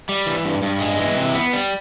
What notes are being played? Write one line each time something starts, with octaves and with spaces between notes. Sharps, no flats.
G3
E3
G2
G2
G#3
E3
C3
B3
G3